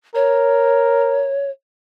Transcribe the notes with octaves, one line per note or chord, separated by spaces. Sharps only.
A#4 C#5